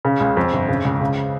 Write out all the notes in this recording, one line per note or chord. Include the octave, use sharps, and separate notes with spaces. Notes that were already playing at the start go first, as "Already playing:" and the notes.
C#3
C#2
F2
G1
C#3
C#2
C#3